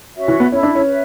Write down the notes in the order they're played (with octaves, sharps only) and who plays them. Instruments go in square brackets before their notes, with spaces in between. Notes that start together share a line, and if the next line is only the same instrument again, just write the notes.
[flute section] C#4 F#4 C#5 E5
[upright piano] E3
B3
[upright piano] C#4 [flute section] E4 A4 E5
[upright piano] D4
C#4
[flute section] B4 E5